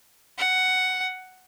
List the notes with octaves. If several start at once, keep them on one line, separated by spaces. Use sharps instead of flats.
F#5